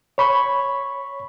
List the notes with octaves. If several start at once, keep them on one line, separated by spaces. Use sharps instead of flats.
C#5 B5 C#6